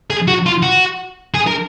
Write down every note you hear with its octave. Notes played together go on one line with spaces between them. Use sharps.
G#4
F#4
F4
F#4
G#4
A#4